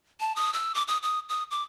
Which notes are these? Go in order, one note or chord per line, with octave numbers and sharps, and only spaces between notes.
A5
D#6
E6
D6
D#6
D#6
D#6
D6